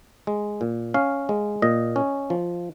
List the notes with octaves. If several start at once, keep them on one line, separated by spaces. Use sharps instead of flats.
G#3
A#2
C#4 F5
G#3
A#2 D#5
C#4
F3